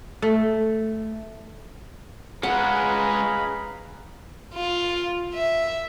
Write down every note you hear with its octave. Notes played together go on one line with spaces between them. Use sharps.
A3
G#3 C#4 G#4 B4 F5 F#5 A#5 B5
F4
E5